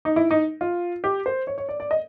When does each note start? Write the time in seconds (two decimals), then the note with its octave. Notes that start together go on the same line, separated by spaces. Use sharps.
0.05 D#4
0.16 E4
0.31 D#4
0.61 F4
1.04 G4
1.26 C5
1.47 C#5
1.58 C#5
1.69 D5
1.80 D5
1.91 D#5